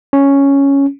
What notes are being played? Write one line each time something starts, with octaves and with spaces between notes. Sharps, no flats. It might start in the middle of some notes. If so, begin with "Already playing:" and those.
C#4